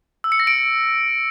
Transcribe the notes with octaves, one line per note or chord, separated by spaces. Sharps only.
E6
C#7
A#6
D7